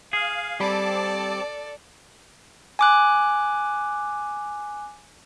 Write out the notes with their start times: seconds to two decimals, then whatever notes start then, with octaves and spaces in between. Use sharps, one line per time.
0.13 G#4 F5
0.60 G3 C4 A4 D5 A5 B5 D6
2.79 G#5 D6 F#6